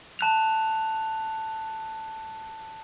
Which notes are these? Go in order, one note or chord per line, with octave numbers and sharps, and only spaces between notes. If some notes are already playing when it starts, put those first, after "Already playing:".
A5 F#6 F7